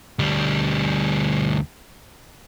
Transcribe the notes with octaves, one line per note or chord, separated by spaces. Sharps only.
D2 G3